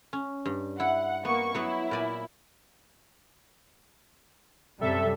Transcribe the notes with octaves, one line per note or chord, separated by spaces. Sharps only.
C#4
G2
E4 F#5
A#3 B3 C#6
F#3 B3 E4 F#4
A#2 D5 G#5
F#2 C3 G3 A4 E5